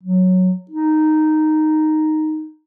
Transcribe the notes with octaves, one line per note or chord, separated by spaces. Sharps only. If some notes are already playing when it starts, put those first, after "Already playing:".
F#3
D#4